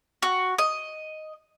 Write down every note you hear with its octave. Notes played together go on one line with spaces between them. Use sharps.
F#4
D#5